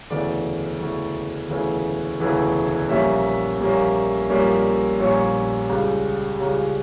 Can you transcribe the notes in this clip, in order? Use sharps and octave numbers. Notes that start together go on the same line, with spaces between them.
E1 D2 C#3 E3 D5
E1 D2 C#3 E3
E1 D2 C#3 E3
E1 D2 C#3 E3
A#1 A#2 G3 A#3 C#4 E5
A#1 A#2 G3 A#3 C#4
A#1 A#2 G3 A#3 C#4
A#1 A#2 G3 A#3 C#4 C#5
C#2 C#3 G3
C#2 C#3 G3 C#5